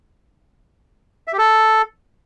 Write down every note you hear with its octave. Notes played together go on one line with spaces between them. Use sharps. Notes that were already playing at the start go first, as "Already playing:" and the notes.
E5
G4
A4